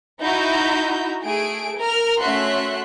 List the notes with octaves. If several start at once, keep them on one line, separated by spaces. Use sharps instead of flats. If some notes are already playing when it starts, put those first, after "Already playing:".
D#4 E4 F#4 E5 A#5 G6
A3 G#4 G#5 D7
A#4 F6
A3 C#4 F#4 E5 C6 F#6